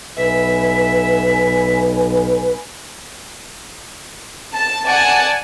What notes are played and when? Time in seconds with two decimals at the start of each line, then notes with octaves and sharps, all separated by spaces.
0.17 B1 B4 E5 G#5
4.53 A5
4.86 D5 F#5 G#5 A5